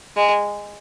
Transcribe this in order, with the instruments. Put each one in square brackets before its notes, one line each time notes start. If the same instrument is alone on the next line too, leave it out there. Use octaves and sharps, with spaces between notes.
[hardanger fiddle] G#3